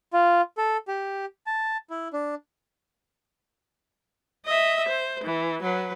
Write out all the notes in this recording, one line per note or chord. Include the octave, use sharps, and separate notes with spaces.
F4
A4
G4
A5
E4
D4
D#5 E5
C5
E3
F#3 B4